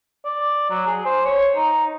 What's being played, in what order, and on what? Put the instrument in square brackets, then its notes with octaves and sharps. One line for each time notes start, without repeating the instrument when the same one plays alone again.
[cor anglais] D5
F#3
G#4
C5
C#5
D#4